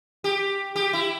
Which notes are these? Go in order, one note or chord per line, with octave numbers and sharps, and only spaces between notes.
G4
G4
E4